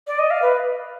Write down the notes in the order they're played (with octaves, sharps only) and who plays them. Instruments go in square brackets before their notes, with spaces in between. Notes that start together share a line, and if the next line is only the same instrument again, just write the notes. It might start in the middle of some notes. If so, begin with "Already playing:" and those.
[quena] D5
D#5
F5
B4